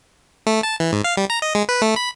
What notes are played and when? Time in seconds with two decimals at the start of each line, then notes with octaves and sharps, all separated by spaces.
0.47 A3
0.63 A5
0.80 E3
0.93 G#2
1.04 F5
1.17 G3
1.30 A#5
1.42 D#5
1.55 G#3
1.69 B4
1.82 A3
1.96 B5